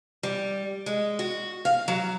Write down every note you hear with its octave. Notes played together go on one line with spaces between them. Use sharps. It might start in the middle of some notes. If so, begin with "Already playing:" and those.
G3
G#3
F#4
F5
F#3